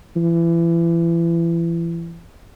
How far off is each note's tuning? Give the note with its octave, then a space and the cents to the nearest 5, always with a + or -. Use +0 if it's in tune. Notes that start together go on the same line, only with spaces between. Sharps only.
E3 +30